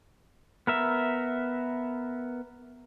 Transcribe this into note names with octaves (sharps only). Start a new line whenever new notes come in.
B3 A#4 E5